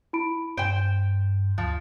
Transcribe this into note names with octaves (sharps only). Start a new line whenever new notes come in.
E4 B5 D7
G2 C5 G5 D7
D2 F3